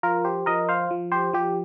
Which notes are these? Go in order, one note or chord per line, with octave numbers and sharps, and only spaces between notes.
F3 F4 A#4
G4 C5
F3 A#4 D#5
C5 F5
F3
G4 C5
F3 G4